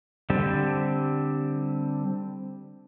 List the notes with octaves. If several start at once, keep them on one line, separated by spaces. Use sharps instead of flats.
D3 G3 C4